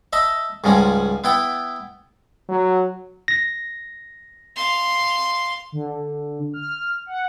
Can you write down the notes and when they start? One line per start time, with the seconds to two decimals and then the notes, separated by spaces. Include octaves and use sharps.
0.13 D#5 E5 A5 B5
0.64 C#2 G#2 F3 G3 C#4
1.24 B3 E4 G5 B5
2.49 F#3
3.28 A#6
4.56 F5 C6
5.72 D3
6.54 F6
7.06 F#5